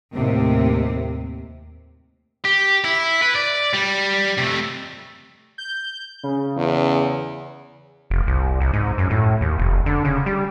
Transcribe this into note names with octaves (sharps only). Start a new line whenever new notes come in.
D#2 A2 C3
G4
E4
B4
D5
G3
C3 A3
G6
C#3
E2
F1
C2
C2
G#2
F#2
A2
D#2
F1
D3
C#3
G3